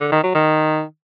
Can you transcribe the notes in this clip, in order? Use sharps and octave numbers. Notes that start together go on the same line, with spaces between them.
D3
D#3
F#3
D#3